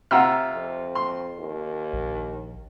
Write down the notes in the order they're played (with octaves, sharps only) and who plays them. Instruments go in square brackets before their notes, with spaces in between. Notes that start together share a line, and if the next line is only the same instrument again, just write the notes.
[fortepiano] C3 F4 [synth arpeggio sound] F#5 A#5 E6
[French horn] F2
[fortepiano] C6
[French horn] D#2
[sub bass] A#1